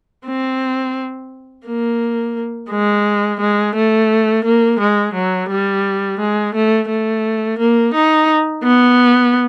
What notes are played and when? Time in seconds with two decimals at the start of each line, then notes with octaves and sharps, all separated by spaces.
0.27 C4
1.66 A#3
2.70 G#3
3.40 G#3
3.76 A3
4.44 A#3
4.80 G#3
5.14 F#3
5.49 G3
6.19 G#3
6.55 A3
6.89 A3
7.59 A#3
7.94 D#4
8.63 B3